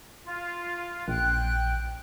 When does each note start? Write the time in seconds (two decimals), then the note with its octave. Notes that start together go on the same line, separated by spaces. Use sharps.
0.25 F4
1.08 A#1 G5 F#6